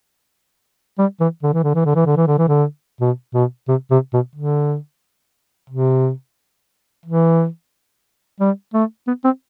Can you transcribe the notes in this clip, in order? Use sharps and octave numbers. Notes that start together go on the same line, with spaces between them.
G3
E3
D3
E3
D3
E3
D3
E3
D3
E3
D3
E3
D3
B2
B2
C3
C3
B2
D3
C3
E3
G3
A3
B3
C4